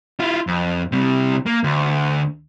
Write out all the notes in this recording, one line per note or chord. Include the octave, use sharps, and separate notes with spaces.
E4 F4
F2
C3 G3
A#3
D2